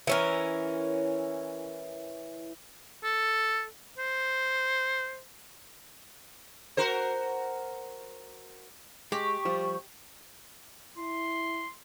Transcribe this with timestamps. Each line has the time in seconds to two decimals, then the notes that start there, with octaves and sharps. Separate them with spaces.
0.07 E3 C#4 A#4
3.03 A4
3.98 C5
6.77 F#4 A#4 C5
9.12 G#3 G4 C#6
9.45 F3 G3
10.98 E4 C6